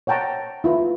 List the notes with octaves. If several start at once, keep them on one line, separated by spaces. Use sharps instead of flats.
C#5 F#5 G5 A5 A#5 C#6
E4 F4 B4